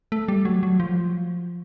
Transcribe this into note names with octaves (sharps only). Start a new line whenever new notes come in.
A3
G3
F#3
F#3
F3